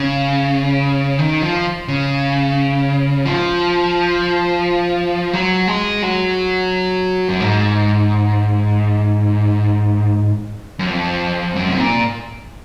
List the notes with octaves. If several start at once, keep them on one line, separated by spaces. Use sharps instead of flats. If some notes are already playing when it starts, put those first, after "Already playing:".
Already playing: C#3
D#3
F3
C#3
F3
F#3
G#3
F#3
F#2
G#2
F#2
F2
F#2
C3
A#2